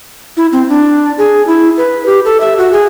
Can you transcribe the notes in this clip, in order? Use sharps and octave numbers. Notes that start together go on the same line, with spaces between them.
E4
C4
D4
G#4
E4
B4
G4
A4
E5
F#4
G#4